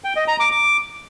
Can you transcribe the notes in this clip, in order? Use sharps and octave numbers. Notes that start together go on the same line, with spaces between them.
G5
D#5
A#5
D6
D6